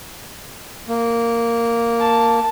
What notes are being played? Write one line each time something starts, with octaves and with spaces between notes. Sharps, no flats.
A#3
A5